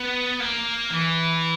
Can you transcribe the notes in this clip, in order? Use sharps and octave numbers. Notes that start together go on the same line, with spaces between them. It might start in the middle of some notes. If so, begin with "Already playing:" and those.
Already playing: B3
A#3
E3